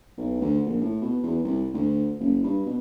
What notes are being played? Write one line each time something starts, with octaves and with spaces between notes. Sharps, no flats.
B1
D2
A#1
A2
B2
E2
C2
D2
F#1
G2
B2